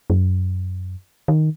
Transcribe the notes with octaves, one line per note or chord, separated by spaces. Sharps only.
F#2
D#3